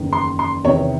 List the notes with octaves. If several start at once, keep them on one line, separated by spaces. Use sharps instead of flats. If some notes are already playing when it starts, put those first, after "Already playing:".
Already playing: F#1 E2 D#3
C6
C6
E2 C3 D#3 C#5